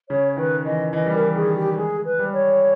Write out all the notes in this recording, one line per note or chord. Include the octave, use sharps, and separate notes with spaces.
C#3 C#5
D#3 B4
E3 D#5
E3 D#5
G3
A#4
E3
D#3 G#4
G4
G#3 G#4
B4
G3
C#5